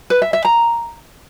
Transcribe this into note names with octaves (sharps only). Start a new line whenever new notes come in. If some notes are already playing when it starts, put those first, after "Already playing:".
B4
E5
E5
A#5